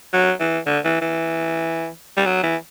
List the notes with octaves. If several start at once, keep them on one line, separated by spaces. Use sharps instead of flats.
F#3
E3
D3
E3
E3
G3
F#3
E3